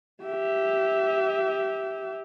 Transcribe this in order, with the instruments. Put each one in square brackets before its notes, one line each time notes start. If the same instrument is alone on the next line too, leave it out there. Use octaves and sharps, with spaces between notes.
[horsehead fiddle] G4 E5